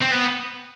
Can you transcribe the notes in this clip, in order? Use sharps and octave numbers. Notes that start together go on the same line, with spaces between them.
C4
B3